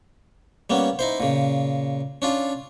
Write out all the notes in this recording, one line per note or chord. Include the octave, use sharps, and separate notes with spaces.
G3 A#3 B3 C#4
D#4 E4 C5
A#2 C#3
C#4 D4 F4